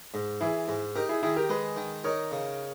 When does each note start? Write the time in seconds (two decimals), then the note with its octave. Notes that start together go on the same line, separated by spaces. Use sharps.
0.14 G#2
0.41 E3 E4 G#4
0.68 G#2
0.95 D#4 G4 A#4
1.09 E4 G#4
1.23 D#3 E4 G#4
1.36 G4 A#4
1.49 G#3 G#4 B4
1.77 D#3
2.04 D#4 A#4 C#5
2.32 C#3